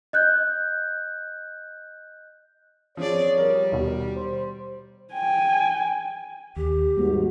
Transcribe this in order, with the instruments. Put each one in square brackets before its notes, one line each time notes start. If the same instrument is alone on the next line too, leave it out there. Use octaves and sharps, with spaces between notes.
[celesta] D#5 F#6 G6
[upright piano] F3 [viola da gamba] C4 G#4 D5 [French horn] C#5
[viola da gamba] G3 [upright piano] A#4
[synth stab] D#2 B2
[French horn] C5
[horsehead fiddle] G5 G#5
[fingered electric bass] D#2 [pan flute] G4
[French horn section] D#2 G#2 F#4 [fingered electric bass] G3 A#3